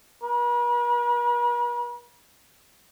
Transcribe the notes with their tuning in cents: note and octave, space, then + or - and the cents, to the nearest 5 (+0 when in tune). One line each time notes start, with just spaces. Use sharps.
B4 -45